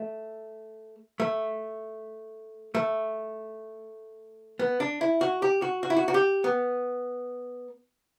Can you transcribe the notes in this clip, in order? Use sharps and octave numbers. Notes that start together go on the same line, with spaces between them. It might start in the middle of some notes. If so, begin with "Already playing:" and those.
Already playing: A3
A3
A3
B3
D4
E4
F#4
G4
F#4
F#4
E4
F#4
F#4
G4
B3